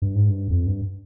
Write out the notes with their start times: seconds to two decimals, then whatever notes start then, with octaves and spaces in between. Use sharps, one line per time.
0.02 G2
0.15 G#2
0.29 G2
0.50 F2
0.67 G2